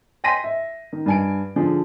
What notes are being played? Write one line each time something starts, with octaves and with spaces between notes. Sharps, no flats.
G5 G#5 C6 A#6 B6 D#7
E5
D#3
G2 G#5 D7
D3 F3 G#4